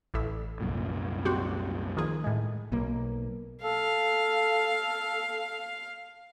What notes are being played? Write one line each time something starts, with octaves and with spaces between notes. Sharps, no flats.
A1 A2 E5
C2 F#2 A#2
C4 F#4 G4
D#3 F3 G#4
A2 G#3
B1 A#3
A4 F5